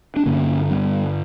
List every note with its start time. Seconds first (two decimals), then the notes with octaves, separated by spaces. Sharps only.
0.16 D4
0.26 G2 D3 A#3 C#4
0.70 G3 B3